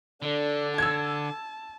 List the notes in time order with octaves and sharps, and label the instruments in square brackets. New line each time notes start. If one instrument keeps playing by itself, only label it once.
[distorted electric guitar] D3 [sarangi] D4 [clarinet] A4
[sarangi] A5 [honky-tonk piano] E6 G#6